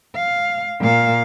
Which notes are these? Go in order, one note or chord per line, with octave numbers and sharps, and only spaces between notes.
F5
A#2 F5